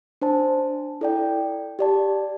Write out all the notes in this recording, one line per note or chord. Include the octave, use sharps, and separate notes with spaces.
D4 C5 A5
E4 A4 D5 G5
G4 D5 A5